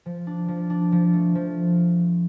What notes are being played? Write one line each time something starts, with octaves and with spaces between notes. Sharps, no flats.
F3
D4
F3
D4
F3
A3
F3